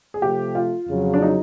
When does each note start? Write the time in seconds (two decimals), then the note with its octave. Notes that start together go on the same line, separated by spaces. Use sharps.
0.14 G#4
0.22 C3 F3 A3 G4
0.55 F4
0.88 F2 C#3 F#3
1.14 D4
1.22 D#4